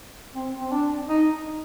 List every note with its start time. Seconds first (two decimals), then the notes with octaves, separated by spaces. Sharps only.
0.35 C4
0.60 C4
0.71 D4
1.09 D#4